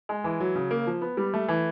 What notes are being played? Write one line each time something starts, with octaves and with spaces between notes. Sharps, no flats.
G#3
E3
F#3
C#3
A#3
F3
B3
G3
A3
E3